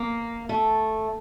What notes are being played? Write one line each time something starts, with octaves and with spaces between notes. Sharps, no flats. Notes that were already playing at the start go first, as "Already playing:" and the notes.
Already playing: A#3
A3